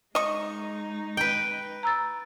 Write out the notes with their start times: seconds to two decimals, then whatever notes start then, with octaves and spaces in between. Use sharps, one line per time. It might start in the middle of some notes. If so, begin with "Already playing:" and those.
0.15 G#3 D#4 D#5 C#6
1.17 B4 G5
1.83 A#5 E6 A6